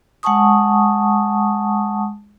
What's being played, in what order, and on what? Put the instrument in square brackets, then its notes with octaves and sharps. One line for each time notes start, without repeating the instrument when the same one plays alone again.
[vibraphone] G#3 F#5 G#5 A5 C#6 D#6